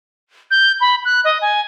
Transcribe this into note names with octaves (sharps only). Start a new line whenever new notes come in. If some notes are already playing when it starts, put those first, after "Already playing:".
G6
B5
F#6
D#5
G#5